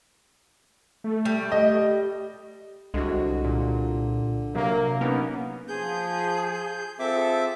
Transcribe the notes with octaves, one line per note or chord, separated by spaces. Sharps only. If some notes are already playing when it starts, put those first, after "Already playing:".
A3
G3
D#5
C2 D3 G#3 F#4
A#2
C3 F#3 A#3
A#3 B3 C#4 D#4
F3 G#4 G6
C4 F4 G#4 A4 E5 D6